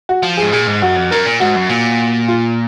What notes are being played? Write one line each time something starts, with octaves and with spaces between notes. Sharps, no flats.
F#4
F3
G#4
G#2
A#2 G#4
G#2
F#2 F#4
F2
F#2 A#4
A#2
G#2 F#4
F#2
A#2
F4